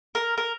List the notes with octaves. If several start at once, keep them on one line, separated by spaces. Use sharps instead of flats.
A#4
A#4